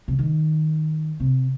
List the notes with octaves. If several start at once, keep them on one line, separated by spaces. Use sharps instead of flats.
C3
D#3
C3